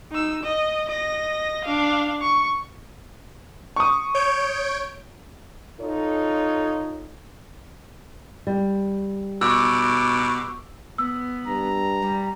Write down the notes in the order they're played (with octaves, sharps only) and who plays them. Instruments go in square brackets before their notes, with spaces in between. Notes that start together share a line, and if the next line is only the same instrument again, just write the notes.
[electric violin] D#4 E6
D#5
D#5 A#6
D4 F5
C#6
[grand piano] C#6 D#6
[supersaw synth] C#5 G6 D7
[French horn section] D#4 F4 A4 C#5
[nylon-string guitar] G3
[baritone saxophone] B2 [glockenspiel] C#6 E6 [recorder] D6
[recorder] B3 [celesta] E6
[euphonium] G2 [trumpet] A#5
[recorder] G3